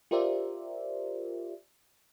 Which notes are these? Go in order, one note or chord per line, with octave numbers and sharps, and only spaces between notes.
F4 G4 A#4 C5 D5 E5